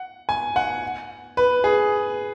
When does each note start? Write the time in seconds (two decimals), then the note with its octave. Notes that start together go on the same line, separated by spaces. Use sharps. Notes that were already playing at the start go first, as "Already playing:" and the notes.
Already playing: F#5
0.29 G#5
0.56 F#5
1.37 B4
1.64 G#4